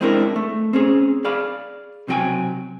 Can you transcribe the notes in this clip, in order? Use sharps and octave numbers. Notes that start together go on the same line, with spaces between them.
G#3 C4 D4 E4 A4 A#4
A3
C4 C#4 G#4
G#4 D5 F5 B5
B1 C3 F#3 F4 G5 G#5